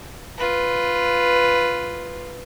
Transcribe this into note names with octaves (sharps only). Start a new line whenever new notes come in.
F4 B4